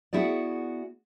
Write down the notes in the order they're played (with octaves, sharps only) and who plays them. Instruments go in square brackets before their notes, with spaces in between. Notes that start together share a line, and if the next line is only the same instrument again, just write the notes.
[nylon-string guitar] B3 E4 F#4 G#4 D5